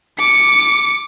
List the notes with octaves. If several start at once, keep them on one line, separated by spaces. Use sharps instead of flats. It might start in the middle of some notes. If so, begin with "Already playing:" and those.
D6 C#7